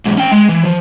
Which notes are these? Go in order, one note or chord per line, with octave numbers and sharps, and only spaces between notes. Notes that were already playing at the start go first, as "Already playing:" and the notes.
E2 G#2
C#4 G5
G#3
E3
F3